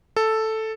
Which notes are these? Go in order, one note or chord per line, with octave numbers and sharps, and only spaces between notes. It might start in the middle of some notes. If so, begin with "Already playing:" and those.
A4